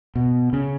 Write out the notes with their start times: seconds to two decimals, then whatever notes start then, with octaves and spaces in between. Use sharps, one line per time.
0.16 B2
0.53 C#3